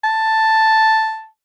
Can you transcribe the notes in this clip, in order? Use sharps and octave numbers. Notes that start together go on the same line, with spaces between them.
A5